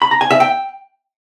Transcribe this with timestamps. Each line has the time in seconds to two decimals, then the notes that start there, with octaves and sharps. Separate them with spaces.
0.02 B5
0.11 A#5
0.21 G#5
0.31 E5
0.40 G5